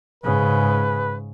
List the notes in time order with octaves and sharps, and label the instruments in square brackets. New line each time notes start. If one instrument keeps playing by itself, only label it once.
[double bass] G#2 C#3 [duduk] B4